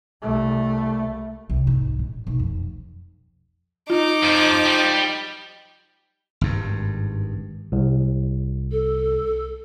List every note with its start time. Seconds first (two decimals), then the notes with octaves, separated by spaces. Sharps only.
0.22 C2 A3
1.50 C2
1.67 G#2
1.99 A#1
2.27 B1
2.39 F2
3.90 D#4 F4 D6
4.23 F2 F3
4.66 G3
6.41 G#1 G2
7.72 C2
8.71 A4